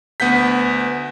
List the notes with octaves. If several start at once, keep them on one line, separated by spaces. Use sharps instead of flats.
D2 B3 F#5 G6 B6